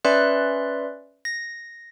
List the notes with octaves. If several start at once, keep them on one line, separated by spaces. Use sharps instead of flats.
C#4 B4 D5 E5 C6 F#6
A#6